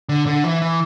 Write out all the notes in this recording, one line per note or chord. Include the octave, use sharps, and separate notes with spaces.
D3
D3
E3
E3